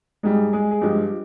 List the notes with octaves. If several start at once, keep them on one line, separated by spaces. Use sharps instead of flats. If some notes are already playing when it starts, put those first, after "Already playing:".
G#2 G3 G#3 G#4
G#3 G#4
G#4
G2 F3 G#3 G4